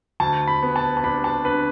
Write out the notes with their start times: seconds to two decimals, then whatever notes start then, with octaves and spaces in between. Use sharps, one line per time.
0.20 D2 A5
0.48 B5
0.63 B3
0.76 A5
0.97 A5
1.03 D4 B5
1.24 A5
1.45 D3 B4